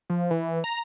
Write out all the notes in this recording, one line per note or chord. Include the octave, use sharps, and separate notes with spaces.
F3
E3
A#5